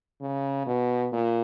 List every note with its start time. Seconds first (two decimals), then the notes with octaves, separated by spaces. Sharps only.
0.21 C#3
0.66 B2
1.12 A#2